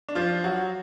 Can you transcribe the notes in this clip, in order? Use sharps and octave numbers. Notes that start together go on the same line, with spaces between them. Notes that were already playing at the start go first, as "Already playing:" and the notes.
D4
F3 F4
F#3 F#4